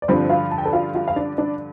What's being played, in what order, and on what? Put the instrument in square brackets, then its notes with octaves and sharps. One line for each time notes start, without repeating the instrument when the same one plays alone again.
[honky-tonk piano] D5
[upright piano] G2 D3 F3 [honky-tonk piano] C4 C5
[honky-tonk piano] F4 F5
A5
G5
A4 A5
F4 F5
F4 F5
F5
D4 D5
D4 D5